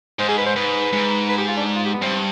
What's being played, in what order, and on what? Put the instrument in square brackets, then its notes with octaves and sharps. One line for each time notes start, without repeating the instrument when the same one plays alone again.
[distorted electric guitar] G#2 [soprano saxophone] C5
[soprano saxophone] G#4
B4
C5
[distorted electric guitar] G#2 [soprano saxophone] B4
[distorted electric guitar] G#2
[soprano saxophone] B4
G4
F4
D4
F4
G4
B3
[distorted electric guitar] G2 [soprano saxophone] C4